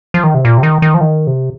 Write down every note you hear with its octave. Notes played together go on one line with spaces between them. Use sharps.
F3
D#3
C3
A#2
C3
D#3
D#3
F3
D#3
C3